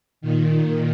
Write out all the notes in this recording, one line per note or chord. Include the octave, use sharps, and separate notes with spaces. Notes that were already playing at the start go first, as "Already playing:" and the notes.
A#2 D#3